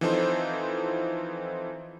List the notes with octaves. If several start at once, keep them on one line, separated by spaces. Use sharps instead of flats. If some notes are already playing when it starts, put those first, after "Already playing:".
E3 F3 C4 D#4 A4 C5